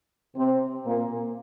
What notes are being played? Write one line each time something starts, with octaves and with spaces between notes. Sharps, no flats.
C3 C4
A#2 A#3